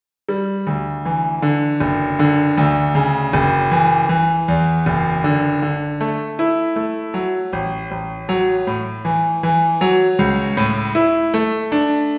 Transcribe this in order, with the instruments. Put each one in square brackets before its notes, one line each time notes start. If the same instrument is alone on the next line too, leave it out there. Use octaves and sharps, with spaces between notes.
[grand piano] G3
D2
E3
D3
F#1
D3
D2
C#3
F#1
E3
E3
E2
F#1
D3
D3
A3
E4
A3
F#3
A1
A1
F#3
A2
E3
E3
F#3
C#2
A2
E4
A3
D4